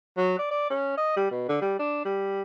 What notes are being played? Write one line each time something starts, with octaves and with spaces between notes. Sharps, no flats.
F#3
D5
D5
C#4
D#5
G3
B2
D3
G3
D4
G3